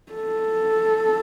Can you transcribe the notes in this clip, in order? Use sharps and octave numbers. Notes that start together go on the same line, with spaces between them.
A4